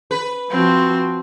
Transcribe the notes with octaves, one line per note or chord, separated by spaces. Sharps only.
B4
F3 C4 F#4